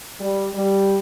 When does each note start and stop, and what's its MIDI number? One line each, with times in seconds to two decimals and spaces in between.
0.20 0.49 55
0.54 0.97 55